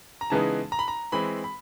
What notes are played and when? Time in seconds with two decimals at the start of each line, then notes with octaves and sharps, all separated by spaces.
0.21 A#5
0.30 C#3 E3 G#3 B3 D#4 A5
0.72 A#5
0.79 B5
0.88 A#5
1.12 E3 G#3 C4 B5
1.44 B5